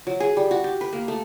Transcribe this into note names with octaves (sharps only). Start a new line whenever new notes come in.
F#3
G#4
G3
F#4
G4
B4
A#3
A3